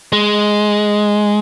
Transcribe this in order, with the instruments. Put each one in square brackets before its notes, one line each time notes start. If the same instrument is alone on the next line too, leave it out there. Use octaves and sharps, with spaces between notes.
[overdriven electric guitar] G#3